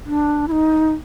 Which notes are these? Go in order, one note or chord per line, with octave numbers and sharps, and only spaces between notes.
D4
E4
D#4